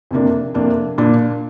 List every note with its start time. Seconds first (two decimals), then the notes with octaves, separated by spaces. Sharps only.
0.11 F2 C3 A#3 D4
0.54 F2 C3 A#3 D4
0.98 A#2 A#3 D4